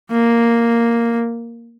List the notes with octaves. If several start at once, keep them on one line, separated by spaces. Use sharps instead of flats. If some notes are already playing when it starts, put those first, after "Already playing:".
A#3